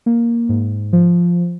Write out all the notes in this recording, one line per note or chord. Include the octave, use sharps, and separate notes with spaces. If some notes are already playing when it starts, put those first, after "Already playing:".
A#3
G#2
F3